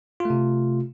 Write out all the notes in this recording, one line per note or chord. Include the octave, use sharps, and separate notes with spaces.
C3 A3 F4